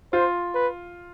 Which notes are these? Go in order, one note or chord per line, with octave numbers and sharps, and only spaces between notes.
F4 C5
B4